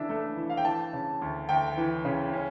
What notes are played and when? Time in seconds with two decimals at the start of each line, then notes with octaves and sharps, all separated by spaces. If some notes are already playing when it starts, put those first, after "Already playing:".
Already playing: C#3 E3 D4 E5
0.09 A3
0.36 E3
0.50 F5
0.57 G5
0.65 E3 A5
0.93 C#3
1.21 D2
1.49 D2 G5
1.77 E3
2.05 C#3
2.33 C#4